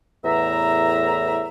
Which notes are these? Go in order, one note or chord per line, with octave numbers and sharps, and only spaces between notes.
E2 A2 E5 A#5